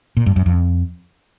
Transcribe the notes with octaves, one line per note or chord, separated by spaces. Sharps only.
A#2
G2
F#2
F2